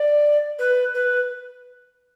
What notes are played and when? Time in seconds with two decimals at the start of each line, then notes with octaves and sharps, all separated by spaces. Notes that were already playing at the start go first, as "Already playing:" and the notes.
Already playing: D5
0.58 B4
0.94 B4